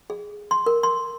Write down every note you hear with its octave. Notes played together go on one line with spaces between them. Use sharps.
G#4
C6
A#4
C6